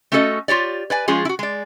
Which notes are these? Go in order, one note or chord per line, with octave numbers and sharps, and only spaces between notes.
A3 C#4 F#4 A4 C5 D#5
F4 G4 C#5 D5
B4 D5 G#5
F3 G#3 C#4 F4 G#4
E4 F#4
G#3 D5